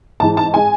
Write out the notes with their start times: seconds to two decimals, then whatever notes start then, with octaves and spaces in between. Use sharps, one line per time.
0.20 G#2 E3 G#3 A5
0.37 A5
0.54 G#3 G#5